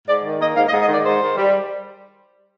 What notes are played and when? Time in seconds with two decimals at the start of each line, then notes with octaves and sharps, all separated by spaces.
0.06 G#2 D5
0.23 D#3
0.39 A#3 D#5
0.55 G#2 F5
0.67 D#5
0.71 G#2
0.80 D#5
0.88 D#3 D5
1.04 G#2 C5
1.21 D#3
1.37 G3